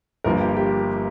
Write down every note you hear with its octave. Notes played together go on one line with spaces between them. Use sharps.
G1 G2 F3 A#3 A#4
G4
G4